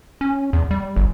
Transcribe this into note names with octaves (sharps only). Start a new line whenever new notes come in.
C#4
E2
G3
G1